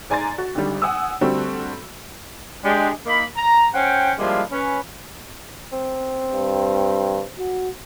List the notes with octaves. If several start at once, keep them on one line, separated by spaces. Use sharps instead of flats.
G#2 D5 G#5 A#5 C6 A6
F#4
G#1 G#2 D3 G3
F#5 G#5 D#6 E6
D3 G3 A3 C4 F#4 A4
G#3 D4 G4
A#3 D#4 B5
A#5
C#4 C5 F#5 G5
F3 G3 G#3 A#3 D4 E4
C#4 B4
C4
G2
F#4